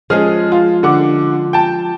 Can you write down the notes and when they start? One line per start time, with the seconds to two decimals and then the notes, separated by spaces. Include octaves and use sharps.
0.10 F3 G#3 C#4 G#4 F6
0.52 F4
0.83 D3 F#5 D6
1.53 G5 A5